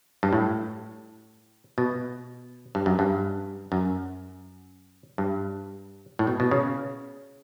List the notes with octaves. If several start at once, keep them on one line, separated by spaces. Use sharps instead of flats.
G2
A2
B2
G2
F#2
G2
F#2
G2
A2
B2
B2
C#3